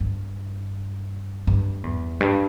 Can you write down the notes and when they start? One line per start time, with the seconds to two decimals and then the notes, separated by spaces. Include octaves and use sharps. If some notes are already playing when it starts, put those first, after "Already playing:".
0.01 G2
1.47 G2
1.84 E2
2.21 G2